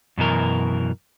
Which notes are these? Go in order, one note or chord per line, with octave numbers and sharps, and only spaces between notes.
F#2 B2 E3 A#4